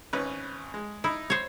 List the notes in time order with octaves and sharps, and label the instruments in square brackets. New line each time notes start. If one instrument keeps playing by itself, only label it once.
[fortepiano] G#1 C#4 B4
G#3
[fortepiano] D#4 [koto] E4
[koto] C5 C#5